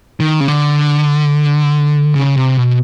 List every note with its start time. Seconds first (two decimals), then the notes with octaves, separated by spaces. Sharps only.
0.20 D#3
0.40 C#3
0.48 D3
2.15 C#3
2.36 C3
2.57 B2